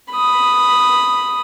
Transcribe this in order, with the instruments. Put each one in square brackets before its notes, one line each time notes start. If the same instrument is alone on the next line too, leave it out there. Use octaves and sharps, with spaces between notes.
[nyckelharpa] B5 D#6